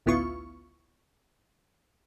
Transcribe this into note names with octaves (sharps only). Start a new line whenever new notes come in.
A1 D2 B3 E4 F4 C#6